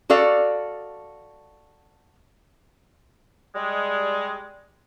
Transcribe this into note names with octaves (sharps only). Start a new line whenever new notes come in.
F#4 A4 D5 F5
G3 G#3